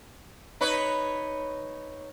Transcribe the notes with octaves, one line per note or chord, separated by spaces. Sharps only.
D#4 B4 C#5